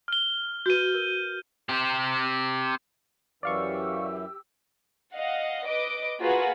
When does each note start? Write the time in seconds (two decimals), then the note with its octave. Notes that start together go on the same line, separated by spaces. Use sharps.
0.08 F6 G7
0.66 F#4 B4 G6 D#7
0.94 A#4
1.69 C4 G4
3.43 F#2 E3 G4 D5 F5 C#6 E6
5.14 D#5 F5 F#5
5.66 B4 D#5 D6 D7
6.20 A#3 F4 F#4 G#4 B4